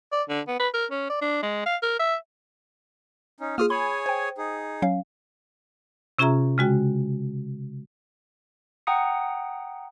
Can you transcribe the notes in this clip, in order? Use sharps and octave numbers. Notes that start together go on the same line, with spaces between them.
D5
D3
B3
B4
A#4
C#4
D5
D4
G#3
F5
A#4
E5
C#4 D#4
A#3 F4 G#4 D#6 F6
G#4 C#5 G#5 B5
C5 G5
D#4 G#4
F#3 C#4 F5
C3 C#4 F4 G#4 E5 A#5
C#3 G#3 F#4 G5
F#5 G5 A#5 D#6 C#7